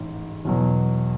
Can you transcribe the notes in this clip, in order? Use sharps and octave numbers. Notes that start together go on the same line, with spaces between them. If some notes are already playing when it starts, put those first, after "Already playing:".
Already playing: A1 G#2 E3
E2 B2 F#3